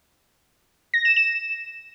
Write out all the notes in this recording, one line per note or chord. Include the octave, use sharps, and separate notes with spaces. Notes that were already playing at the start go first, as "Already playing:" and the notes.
A#6
E7
E7